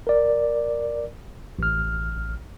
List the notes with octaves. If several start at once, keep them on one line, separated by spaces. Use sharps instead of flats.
A#4 D5
A1 F6